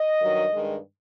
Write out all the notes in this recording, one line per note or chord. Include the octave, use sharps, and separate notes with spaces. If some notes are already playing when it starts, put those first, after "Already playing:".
Already playing: D#5
G2 D#3 F#3
G2 D#3 G#3